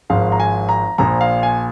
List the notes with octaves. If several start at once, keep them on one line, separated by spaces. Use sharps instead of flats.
G#1 G#2 F3 F5
A#5
G#5
A#5
A#1 A#2 F3 A#5
F5
G#5